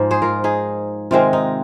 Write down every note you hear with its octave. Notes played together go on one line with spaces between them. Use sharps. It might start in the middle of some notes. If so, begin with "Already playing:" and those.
Already playing: G#2 F3 G#3
G#4 C5
F4 A#4
D#4 G#4
C3 D#3 G#3 C4 F4
D#4